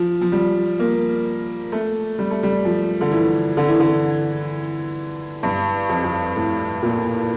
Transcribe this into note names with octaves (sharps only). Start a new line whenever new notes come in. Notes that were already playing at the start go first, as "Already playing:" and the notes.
Already playing: F3
F3
G3
A#3
A3
G3
A3
G3
F3
D3
E3
D3
E3
D3
G2
F2
F2
A2
A#2